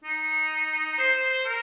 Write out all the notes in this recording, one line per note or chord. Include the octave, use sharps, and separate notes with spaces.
D#4
C5
C5
C5
A#4